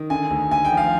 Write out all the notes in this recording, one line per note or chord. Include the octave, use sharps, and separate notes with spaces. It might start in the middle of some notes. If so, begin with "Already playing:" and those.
Already playing: D#3
D3 G#5
D2
D2 G#5
G5
F3
F5